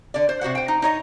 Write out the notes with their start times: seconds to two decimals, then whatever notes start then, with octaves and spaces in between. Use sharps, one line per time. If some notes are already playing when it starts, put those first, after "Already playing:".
0.14 D3 D5
0.29 C5
0.41 C3 F#4 C5 F#5
0.55 C5 G5
0.68 D#4
0.82 D#4 C#5 D#5